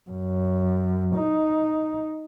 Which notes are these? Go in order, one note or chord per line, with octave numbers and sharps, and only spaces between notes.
F#2
D#4